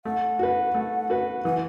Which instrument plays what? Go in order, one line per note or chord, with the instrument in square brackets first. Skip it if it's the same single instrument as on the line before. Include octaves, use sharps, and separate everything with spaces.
[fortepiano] A3 [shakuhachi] F#5
[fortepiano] F#4 B4
A3
F#4 B4
[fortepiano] E3 [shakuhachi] F#5